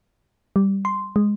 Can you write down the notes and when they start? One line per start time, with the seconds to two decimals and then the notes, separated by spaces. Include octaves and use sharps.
0.56 G3
0.85 C6
1.16 G#3